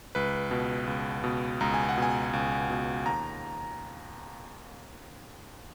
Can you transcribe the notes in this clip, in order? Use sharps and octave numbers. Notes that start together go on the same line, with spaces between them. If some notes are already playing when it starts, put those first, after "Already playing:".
C#2 B4
B2
C#2
B2
C#2 A#5
G#5
F#5
B2 G#5
C#2
B2
D#2 A#5